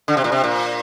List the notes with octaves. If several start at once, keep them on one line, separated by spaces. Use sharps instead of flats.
D3
C3
A#2
C3
A#2